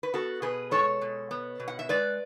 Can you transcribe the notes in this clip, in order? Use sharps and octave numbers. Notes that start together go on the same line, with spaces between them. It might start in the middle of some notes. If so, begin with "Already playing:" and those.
B4
B3 F#4 A4
B2 G#4 B4
G#3 A4 C#5
B2
B3
B2
F#5
E5
G#3 B4 D5